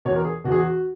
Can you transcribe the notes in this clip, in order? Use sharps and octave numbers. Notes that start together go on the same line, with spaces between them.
E2 B2 C#5
A#4
G#4
E2 B2 F#4
G#4
F#4